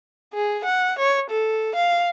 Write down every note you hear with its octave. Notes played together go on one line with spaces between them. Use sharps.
G#4
F#5
C#5
A4
F5